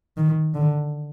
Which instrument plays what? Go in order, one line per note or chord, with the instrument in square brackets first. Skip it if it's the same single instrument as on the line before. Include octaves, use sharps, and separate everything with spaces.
[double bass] D#3
D3